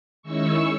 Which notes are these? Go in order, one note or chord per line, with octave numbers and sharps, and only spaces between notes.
D#3 G#3 C#4 E4 C#6 E6